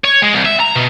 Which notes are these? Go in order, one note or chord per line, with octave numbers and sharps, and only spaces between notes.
C#5
G#3
C2
E5
A#5
B2